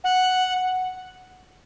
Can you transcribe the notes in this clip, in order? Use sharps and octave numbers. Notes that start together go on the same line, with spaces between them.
F#5